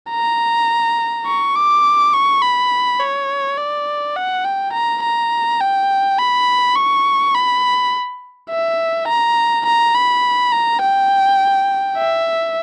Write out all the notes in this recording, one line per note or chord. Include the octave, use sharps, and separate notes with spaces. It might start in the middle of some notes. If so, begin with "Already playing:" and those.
A#5
C#6
D6
C#6
B5
C#5
D5
F#5
G5
A#5
A#5
G5
B5
C#6
B5
E5
A#5
A#5
B5
A#5
G5
E5